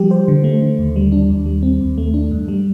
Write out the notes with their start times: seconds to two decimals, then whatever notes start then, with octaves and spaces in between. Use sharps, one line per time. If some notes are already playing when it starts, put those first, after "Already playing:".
Already playing: F3 G3 G4
0.11 C5
0.28 D3
0.44 A3
0.62 D3
0.79 D#2
0.96 G3
1.12 D4
1.30 D#2
1.46 G3
1.63 C4
1.80 D#2
1.98 A3
2.14 D4
2.31 G2
2.48 G3